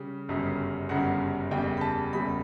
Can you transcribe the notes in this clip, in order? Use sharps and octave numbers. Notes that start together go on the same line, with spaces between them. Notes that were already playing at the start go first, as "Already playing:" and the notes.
Already playing: C#3 G3
G1 F#2 C#3 G3
G1 F#2 C#3 G3 F#5
F#1 E2 C#3 G3 G5
B5
A5
F#1 E2 C#3 G3 B5